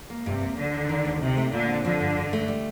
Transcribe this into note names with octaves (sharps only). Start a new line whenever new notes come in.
A#3
G2 C3
A#3
D2 D3
D#3
D#3
D2
C3 D#4
A3
A#2 D3
C4
D3 F3
G2
G2
A3
G3